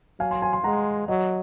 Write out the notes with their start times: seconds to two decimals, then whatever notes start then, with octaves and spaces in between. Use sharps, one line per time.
0.19 F#3 F5 G#5
0.31 G#5 C6
0.42 G#5 C6
0.53 G#5 C6
0.64 G#3 F#5 A#5
1.08 F#3 D#5 F#5